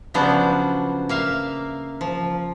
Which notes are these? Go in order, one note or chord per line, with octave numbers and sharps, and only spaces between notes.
C#3 F3 F#3 B3 D4 C5
A#3 E5 F5
F3